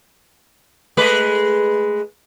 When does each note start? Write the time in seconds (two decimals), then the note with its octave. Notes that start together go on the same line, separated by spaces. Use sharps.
0.97 G#3 A3 B4